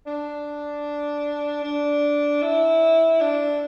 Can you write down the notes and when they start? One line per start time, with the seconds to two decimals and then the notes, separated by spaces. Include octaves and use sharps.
0.07 D4
1.63 D4
2.42 E4
3.21 D4